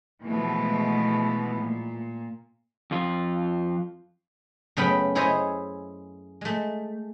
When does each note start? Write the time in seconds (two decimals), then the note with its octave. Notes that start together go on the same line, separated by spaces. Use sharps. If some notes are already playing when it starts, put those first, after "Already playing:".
0.22 B2 E3 F3 G#3 A3 B3
1.57 A#2
2.91 F2 F4
4.77 F#2 C#3 A3 B3 G5 B5
5.15 E4 G#4 C5 C#5 D#5 E5
6.41 G#3 A3